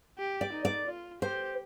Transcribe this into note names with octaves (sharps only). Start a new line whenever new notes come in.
G4
D5
D#4
D5
F4
G4 C5